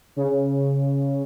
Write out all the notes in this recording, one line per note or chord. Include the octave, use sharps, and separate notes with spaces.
C#3